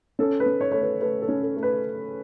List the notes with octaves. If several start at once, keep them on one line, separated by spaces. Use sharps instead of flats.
C#4 A4
B4
C#4
C#5
A3 C#5
B4
A3 B4
A4
C#4
A4
A3
B4